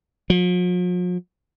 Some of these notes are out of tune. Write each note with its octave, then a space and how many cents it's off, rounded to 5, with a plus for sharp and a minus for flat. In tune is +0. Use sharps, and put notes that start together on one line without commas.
F3 +45